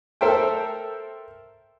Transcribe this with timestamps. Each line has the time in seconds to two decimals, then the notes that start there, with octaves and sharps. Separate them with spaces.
0.21 A4 A#4 C5 E5 G5